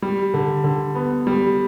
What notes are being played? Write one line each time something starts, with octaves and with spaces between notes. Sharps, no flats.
G3
D3
D3
B3
G3